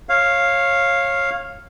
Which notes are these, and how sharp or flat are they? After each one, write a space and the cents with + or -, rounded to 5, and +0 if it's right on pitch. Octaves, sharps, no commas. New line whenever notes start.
C#5 -20 F5 +0